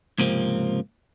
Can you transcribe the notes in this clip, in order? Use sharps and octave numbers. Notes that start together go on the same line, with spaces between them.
C#2 G#2 C3 F3 A#3 C4